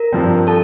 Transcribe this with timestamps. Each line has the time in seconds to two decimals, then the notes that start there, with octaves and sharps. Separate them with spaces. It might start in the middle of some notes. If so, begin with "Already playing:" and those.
Already playing: A#4 A#5
0.13 G2 F3 C4
0.47 A4 A5